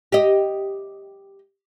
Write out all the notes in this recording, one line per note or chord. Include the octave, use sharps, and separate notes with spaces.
G4 D#5